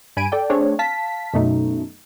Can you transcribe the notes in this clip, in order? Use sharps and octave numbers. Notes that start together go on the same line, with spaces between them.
G2 G#5 B5 G#6 D7 D#7
A4 D5 G5
A3 C4 D4 G#4 C#5
F5 A5 B6
F#2 B2 A3 D#4